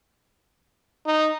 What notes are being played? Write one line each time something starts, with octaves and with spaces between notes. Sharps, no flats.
D#4